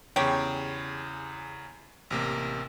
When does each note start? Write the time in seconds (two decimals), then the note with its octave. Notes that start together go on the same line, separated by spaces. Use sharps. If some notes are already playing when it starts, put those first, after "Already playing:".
0.16 E2 C#3 G4 C#5
2.11 A1 C3 A#3